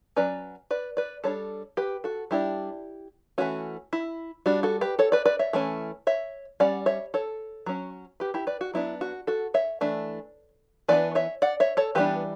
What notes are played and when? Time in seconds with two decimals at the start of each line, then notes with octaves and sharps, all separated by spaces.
0.16 F#3 C#4 B4 D5
0.71 B4 D5
0.97 B4 D5
1.24 G3 D4 A4 C#5
1.77 G4 B4
2.04 F#4 A4
2.31 G3 D4 E4 G4
3.38 E3 A3 C#4 F#4
3.93 E4
4.46 G3 D4 F#4
4.63 F#4 A4
4.81 G4 B4
4.99 A4 C#5
5.12 B4 D5
5.25 B4 D5
5.39 C#5 E5
5.53 E3 A3 C#4
6.07 C#5 E5
6.60 G3 C#4 D5 F#5
6.86 C#5 E5
7.14 A4 C#5
7.66 F#3 C#4
8.20 G4 B4
8.34 E4 G4
8.47 B4 D5
8.61 F#4
8.74 F#3 B3 D4 E4
9.01 F#4
9.27 F#4 A4
9.54 C#5 E5
9.81 E3 A3 D4
10.88 E3 B3 D4 B4 D5
11.15 C#5 E5
11.42 D5 F#5
11.60 C#5 E5
11.77 A4 C#5
11.95 E3 G3 B3 D4 G4 B4